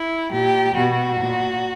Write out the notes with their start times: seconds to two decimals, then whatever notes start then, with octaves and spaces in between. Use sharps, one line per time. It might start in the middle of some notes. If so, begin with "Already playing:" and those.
Already playing: E4
0.31 A#2 G4
0.75 B2 F#4
1.20 A#2